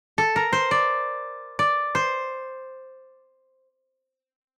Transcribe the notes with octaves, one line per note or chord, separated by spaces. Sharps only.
A4
A#4
C5
D5
D5
C5